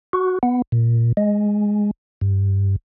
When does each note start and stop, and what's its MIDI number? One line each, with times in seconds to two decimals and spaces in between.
0.13 0.39 66
0.43 0.62 59
0.72 1.12 46
1.17 1.91 56
2.21 2.76 43